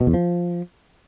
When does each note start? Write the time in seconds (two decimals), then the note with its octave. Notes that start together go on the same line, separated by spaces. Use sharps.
0.01 B2
0.07 E2
0.14 F3